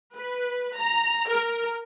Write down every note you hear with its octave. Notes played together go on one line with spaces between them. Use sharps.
B4
A#5
A#4